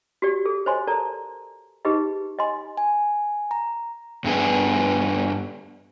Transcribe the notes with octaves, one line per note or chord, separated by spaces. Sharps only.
F#4 G4 D5
G#4 A4
C5 C#5 D#5 G#5 C6
A4 A#4 D5 A5 A#5
D#4 G4 G#4 B4 D#5
D#5 G#5 C6
G#5
A#5
G2 B3 G#4